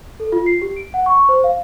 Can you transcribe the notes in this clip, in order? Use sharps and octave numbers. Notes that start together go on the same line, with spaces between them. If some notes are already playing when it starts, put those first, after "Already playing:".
A4
F4
C7
G4
D7
F#5
C#6
C5
F5